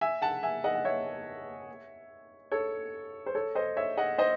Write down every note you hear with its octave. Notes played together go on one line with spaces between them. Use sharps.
E5 G#5
F#5 A5
E5 G#5
D#5 F#5
F#5
C#5 E5
A4 C#5
C5
A4 C#5
C5 D#5
C#5 E5
D#5 F#5
C5 D#5